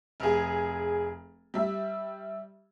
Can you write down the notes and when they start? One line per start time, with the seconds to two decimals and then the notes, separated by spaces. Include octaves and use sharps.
0.20 F1 G#4
1.54 G3 E5